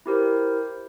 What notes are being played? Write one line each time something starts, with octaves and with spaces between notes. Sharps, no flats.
E4 G4 A#4 C5